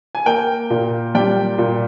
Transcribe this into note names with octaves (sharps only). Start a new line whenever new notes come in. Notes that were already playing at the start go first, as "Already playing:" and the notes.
G#5
A#3 G5
A#2
G3 G5
A#2